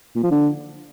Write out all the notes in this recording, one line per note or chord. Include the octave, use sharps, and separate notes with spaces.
A#2
F3
D3